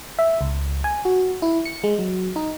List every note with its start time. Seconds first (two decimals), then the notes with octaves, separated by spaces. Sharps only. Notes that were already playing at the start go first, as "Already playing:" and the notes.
0.19 E5
0.41 C#2
0.84 G#5
1.05 F#4
1.42 E4
1.65 C#7
1.84 G#3
1.99 F#3
2.36 D#4